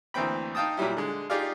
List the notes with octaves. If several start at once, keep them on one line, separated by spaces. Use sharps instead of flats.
D2 E3 A#3 C4 G5 B5
D#4 F5 G5 A5 D#6
A#2 F#3 G3 E4
D3 G#3
D#4 F4 G4 G#4 D5 F5